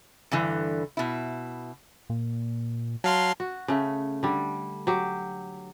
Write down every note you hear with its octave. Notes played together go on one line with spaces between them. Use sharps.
G2 D3 E3
B2 E4
A#2
F#3 F5 A5 C6
F#4
C#3 A3
D3 G3
F#3 G4